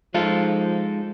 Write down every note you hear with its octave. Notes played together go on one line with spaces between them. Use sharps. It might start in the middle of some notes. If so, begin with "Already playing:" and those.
F3 G#3 D#4 F4 A4